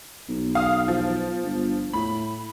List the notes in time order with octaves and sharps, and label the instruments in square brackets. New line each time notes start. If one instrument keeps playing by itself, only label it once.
[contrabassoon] B1
[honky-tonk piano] F5 D#6
F3
[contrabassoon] G1
[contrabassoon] A2 [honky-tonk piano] B5